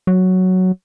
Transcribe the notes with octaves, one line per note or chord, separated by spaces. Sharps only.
F#3